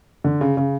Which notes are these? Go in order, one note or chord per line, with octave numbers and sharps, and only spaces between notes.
D3
C#3
C#3